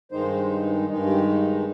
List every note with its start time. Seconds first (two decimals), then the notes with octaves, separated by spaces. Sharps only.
0.11 G2 D#3 G#3 D#4 C5
0.88 G2 D#3 G#3 D#4
1.07 G4